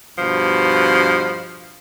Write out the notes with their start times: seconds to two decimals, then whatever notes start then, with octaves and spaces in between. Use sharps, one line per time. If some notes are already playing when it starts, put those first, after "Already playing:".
0.18 G2 B2 F3